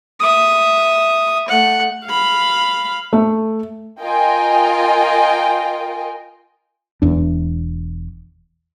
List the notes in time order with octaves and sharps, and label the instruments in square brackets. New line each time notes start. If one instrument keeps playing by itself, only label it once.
[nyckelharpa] E5 D#6
A3 F#5
[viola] F5 B5
[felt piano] A3
[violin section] F4 A#4 D#5 G5 G#5
[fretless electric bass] E1 E2 D4